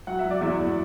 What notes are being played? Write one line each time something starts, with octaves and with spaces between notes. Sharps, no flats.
F#3 F#5
E5
F#3
D5
E2 E4 E5
E2